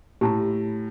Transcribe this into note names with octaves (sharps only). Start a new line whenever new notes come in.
A2 G4 A5 A#5